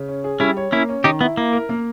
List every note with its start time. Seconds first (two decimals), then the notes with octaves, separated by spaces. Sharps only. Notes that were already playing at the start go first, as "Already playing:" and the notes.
Already playing: C#3
0.08 C#4
0.24 G#4
0.40 G3 C#4 E4
0.57 C#5
0.72 A#3 C#4 E4
0.89 C#4
1.04 D#3 D#4 G4
1.21 B3 E4
1.37 A#3 E4
1.53 A#4
1.69 A#3